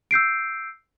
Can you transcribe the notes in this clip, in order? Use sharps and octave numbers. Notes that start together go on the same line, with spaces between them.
E6 G6 C7 D7